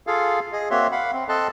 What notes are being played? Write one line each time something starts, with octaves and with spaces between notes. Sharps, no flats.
F4 G#4 A4 F5
G#4 D#5
A#3 C4 F#4 C#5 E5 C6
F5 F#5 B5
C4
C4 A4 D#5 A5 C6 F#6